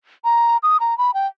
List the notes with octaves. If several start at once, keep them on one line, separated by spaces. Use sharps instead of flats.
A#5
D#6
A#5
B5
G5